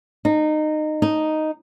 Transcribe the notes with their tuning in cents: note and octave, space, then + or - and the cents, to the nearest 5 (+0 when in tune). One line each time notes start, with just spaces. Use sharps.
D#4 -20
D#4 +0